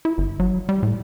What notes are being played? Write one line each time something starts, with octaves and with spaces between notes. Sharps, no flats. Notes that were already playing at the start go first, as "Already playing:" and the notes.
E4
G1
F#3
G3
A2